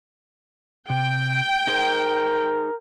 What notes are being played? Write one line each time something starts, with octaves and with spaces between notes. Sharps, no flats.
C3 G5
D#4 G#4 A#4 C5